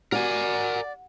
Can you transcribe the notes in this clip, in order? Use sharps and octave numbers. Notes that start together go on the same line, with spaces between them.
F#4 A#4 D5 G#5